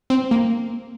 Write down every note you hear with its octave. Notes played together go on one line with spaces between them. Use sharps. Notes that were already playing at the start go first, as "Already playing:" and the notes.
C4
A#3